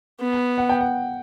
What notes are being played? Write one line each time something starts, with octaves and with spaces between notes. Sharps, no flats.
B3
F#5
G5
F#5